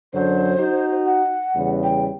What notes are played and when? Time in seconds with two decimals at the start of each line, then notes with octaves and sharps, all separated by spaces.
0.13 F#2 D3 F#3 C5
0.58 D#4 F#4
1.06 F#5
1.55 E2 C#3 G3
1.83 G5